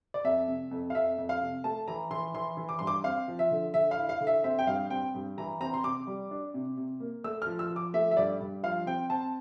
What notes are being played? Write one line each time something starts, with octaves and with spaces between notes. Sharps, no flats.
D5
F2 E5
C3
F2
F5
F2 E5
F2
F5
C3
A3 A5
E3 A#5
E3 C6
E3 C6
E3
D6
G2 C6
D6
C4 F5
F3
E5
D3
D3 E5
F5
E4
F5
D3
E5
C4 E5
G5
G2 F5
C4 G5
G2
E3 A#5
C4 A#5
C6
C3 D6
G3
D4
C3
C3
A#3
A3 E6
F3 F6
E6
F3
D6
A3 E5
E5
G2 D5
G2
F3 F5
C4 G5
C4 A5